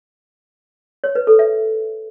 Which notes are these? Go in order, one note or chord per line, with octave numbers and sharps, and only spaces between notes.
C#5
B4
A4
E5